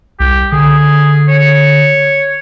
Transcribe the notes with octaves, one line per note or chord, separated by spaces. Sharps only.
C2 G4
D3 G#4
C#5